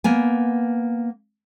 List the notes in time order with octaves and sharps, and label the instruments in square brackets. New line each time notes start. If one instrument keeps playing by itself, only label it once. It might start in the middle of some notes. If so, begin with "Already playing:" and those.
[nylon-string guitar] A#3 B3 G#5